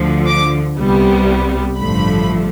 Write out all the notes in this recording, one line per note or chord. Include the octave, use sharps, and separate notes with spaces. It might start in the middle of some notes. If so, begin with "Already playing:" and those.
Already playing: D2 D3 F3
D6
C2 C3 G3 B3
A1 G2 D3 F3 A3 B5